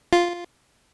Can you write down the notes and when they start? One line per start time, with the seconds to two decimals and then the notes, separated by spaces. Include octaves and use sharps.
0.13 F4